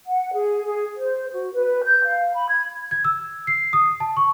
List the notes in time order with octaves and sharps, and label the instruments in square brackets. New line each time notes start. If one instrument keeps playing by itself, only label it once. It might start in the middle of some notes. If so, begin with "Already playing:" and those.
[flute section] F#5
G#4
G#4
C5
F#4
B4
G6
F5
B5
G#6
[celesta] G#6
E6
C7
D#6
A5
C#6